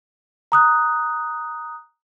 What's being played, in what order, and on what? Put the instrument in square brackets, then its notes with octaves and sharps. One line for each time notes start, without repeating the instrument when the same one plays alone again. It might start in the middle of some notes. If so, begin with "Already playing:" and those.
[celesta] A#5 D#6 F#6